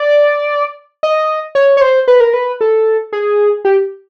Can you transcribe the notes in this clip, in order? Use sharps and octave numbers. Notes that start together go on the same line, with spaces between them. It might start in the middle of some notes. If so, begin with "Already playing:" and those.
Already playing: D5
D#5
C#5
C#5
C5
B4
A#4
B4
A4
G#4
G4